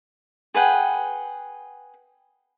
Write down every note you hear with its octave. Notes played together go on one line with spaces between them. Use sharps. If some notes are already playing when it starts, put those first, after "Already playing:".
G#4 B4 F#5 G5